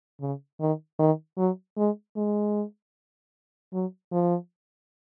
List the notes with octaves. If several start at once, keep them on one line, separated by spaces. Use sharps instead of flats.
C#3
D#3
D#3
F#3
G#3
G#3
F#3
F3